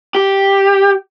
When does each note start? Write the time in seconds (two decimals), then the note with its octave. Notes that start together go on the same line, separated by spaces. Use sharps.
0.15 G4